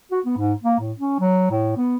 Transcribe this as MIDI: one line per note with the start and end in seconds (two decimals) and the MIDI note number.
0.11 0.20 66
0.26 0.35 59
0.37 0.53 44
0.63 0.78 58
0.79 0.93 45
0.99 1.16 61
1.20 1.48 54
1.51 1.73 45
1.77 1.97 59